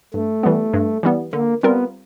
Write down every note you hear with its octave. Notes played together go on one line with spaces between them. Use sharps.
G2 A3
E3 G3 B3
G2
E3 G3 B3
D3 A#3
G3 B3 C4 F4 A#4